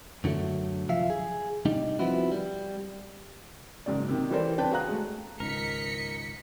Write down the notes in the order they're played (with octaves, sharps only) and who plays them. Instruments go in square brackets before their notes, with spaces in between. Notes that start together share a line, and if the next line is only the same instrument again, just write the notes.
[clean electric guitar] F#2 D3 F#3 A3
C2 C3 F3 E5 F5
G#4
C3 G3 D4 D#4
F3 B3 C4 E4 F#4
G3
[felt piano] F#1 G#2 F#3 D5
C3 D#3
E3 G3 A4 A#4 C5 D5
C4 D4 B4 G5 A5
F#4 G#4 F5 A#5 F#6
G#3 A3
[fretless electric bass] C#2 G#2 D#3 [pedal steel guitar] A#4 [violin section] D#5 B6 C#7